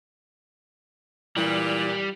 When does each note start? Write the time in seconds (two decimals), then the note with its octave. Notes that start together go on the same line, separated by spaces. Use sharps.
1.37 A#2 E3 G3